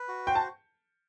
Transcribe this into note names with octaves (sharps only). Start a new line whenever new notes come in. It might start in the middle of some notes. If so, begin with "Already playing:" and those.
Already playing: B4
F#4
C5 G5
A5